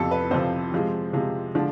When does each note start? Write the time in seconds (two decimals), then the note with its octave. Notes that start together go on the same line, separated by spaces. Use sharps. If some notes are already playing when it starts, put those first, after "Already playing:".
Already playing: F2 C3 F3 A4
0.11 B4
0.31 F2 C3 F3 C5
0.72 C3 F3 G#3
1.13 C3 F3 G#3
1.55 D3 F3 G#3 D4